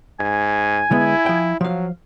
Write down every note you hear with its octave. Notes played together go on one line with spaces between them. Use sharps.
G#2 G#5
D3 G#3 B3 E4
F3 G5
F3 F#3 F5